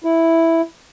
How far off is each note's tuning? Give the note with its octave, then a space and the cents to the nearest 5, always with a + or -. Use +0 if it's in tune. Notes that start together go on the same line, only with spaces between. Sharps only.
E4 +0